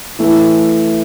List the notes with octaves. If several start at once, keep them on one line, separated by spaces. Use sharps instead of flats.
E3 A3